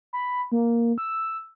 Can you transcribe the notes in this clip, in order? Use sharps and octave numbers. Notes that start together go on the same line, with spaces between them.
B5
A#3
E6